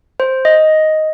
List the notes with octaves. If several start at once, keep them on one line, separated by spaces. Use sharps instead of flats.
C5
D#5